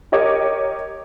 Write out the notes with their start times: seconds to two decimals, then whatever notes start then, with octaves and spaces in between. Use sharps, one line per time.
0.12 G4 A#4 C#5 D#5 D6